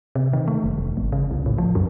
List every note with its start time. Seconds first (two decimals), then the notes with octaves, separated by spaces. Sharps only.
0.15 C3
0.33 D#3
0.48 A3
0.64 F#1
0.78 F1
0.97 G#1
1.12 C#3
1.31 C2
1.46 A2
1.58 F3
1.75 F#2